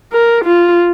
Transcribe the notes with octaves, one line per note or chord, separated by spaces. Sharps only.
A#4
F4